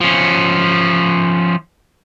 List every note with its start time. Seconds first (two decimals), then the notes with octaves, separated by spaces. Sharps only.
0.01 F3 C#4